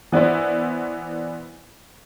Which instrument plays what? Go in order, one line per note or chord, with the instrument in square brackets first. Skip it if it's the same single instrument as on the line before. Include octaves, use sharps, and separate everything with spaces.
[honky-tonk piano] E3 B3 D4 E4 C5